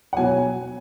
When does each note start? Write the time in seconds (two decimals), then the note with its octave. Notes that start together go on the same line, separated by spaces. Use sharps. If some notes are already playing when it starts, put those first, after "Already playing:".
0.13 F#5
0.17 B2 F#3 G#5